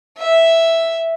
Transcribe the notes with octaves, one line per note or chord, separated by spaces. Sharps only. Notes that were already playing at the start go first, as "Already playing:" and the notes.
E5